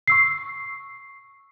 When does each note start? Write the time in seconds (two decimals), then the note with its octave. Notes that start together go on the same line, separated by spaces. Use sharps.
0.08 C#6 E6 C7